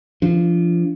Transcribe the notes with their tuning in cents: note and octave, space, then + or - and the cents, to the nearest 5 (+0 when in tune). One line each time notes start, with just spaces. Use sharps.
F3 -25 D4 -15